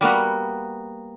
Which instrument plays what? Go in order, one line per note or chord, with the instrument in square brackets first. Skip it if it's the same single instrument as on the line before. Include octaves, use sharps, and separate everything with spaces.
[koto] G3 A#3 B3 F#4